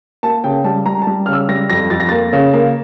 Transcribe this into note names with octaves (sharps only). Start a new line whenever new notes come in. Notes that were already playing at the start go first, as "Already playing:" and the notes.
A#3 A5
C#3 G5
G3 A5
G3 A#5
A5
G3
C#3 F6
E6
G3 A#6
F2 A#6
F2 A6
A#6
A#3 A6
C#3
A#3